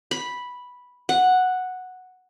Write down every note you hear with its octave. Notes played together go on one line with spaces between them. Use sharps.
B5
F#5